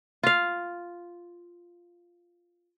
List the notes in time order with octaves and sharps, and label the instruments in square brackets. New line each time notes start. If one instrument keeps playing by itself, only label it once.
[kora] F4 F5